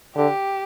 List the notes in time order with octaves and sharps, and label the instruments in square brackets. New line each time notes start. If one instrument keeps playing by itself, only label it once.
[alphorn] D3 [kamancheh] G4